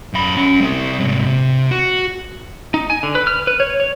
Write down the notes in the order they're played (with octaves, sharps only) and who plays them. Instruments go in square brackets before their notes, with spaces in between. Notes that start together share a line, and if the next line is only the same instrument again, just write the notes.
[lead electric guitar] F#2 B5
C#4 F#5
G3 C4
G#2 C3
C3
F#4
[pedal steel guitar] D#4
G#5
D3
B4
F6
B4
C#5
C#5